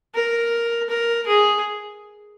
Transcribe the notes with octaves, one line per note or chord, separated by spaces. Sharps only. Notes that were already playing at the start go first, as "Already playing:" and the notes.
A#4
A#4
G#4